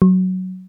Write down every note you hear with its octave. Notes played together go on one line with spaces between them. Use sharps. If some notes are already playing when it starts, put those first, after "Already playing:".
F#3